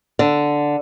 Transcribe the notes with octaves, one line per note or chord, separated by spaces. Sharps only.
D3